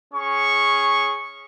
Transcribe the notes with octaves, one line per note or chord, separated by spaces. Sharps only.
C#4 G#4 C#6